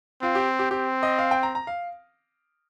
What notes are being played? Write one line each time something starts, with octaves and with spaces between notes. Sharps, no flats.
C4 F4
G4
G4
C4 G4
D#5
F5
G5
A#5
A#5
F5